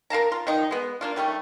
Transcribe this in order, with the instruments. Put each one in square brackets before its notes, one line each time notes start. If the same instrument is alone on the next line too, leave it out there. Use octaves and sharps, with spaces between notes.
[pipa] A#4 F5 A5 A#5
F4
D#3 F3 D#4
G#3 B3
A#3 D4 F4
D#3 G3 A3 C#4